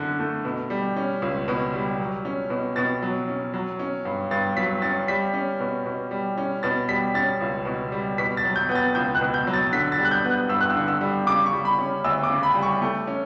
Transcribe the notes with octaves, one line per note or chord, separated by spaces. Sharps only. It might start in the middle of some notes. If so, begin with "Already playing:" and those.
Already playing: F#2 D3
A3
B2
G3
C#4
C#2
B2
G3
F#3
C#4
B2
B2 A6
F#3
C#4
F#3
C#4
G2
G2 A6
F#3 B6
C#4 A6
G3 B6
C#4
B2
B2
G3
C#4
B2 A6
G3 B6
C#4 A6
C#2
B2
G3
B2 B6
A6
F#3
G6
B3 G6
A6
C#2 G6
F#6
B2
G6
F#3
A6
D3 B6
A6
G3
F#6
G6
B3
F#6
G2 E6
F#6
E6
D3
E6
G3
C#3 D6
C#6
G3
B5
C#4
D2 E6
D6
C#3
B5
G3
C#6
A3
C#4